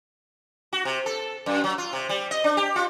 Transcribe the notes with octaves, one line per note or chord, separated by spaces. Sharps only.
F#4
C3
A4
F#2
F#3
F4
C3
G3
D#5
D4
G4
F4